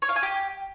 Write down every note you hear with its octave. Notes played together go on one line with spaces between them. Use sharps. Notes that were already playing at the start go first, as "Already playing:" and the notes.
C#5
F5
G#5
G4